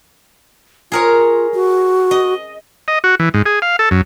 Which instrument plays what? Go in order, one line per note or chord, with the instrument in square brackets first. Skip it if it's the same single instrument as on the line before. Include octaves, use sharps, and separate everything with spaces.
[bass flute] F4 [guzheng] G#4 A#4 C#5
[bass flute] F#4
[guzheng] D#5
[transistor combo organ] D#5
F#4
E3
G#2
G#4
F5
A4
F#2